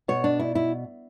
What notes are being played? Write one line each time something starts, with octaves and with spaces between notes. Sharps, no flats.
B2 C#5
D4
E4
E4